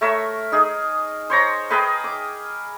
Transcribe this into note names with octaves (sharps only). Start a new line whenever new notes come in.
A3 A#4 C#5 E5
D#4 G#4
C5 C#5 A#5
G#4 A#4 B4 G5
D6